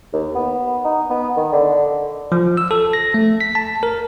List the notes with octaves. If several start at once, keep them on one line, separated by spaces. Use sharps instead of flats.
D#2
B3
D#4
B3
D#3
D3
F3
E6
A4
A#6
A3
B6
A5
A#4